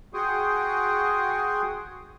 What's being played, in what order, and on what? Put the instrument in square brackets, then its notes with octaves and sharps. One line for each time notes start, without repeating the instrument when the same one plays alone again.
[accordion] F#4 G#4 G5 C6 C#6 D#6